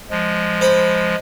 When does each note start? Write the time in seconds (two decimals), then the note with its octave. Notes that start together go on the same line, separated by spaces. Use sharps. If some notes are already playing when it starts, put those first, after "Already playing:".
0.10 F3 G#3
0.61 C5 B5